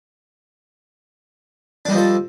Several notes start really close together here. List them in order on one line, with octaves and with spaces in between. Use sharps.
D4 G3 D#4 F3 A4